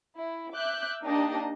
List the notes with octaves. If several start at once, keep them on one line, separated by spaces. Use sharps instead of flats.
E4
E5 D6 F#6 G6
A#3 D4 D#4 G4 D#5